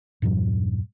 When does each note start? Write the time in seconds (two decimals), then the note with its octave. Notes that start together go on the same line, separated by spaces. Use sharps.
0.22 E2 G2 A#2 F#3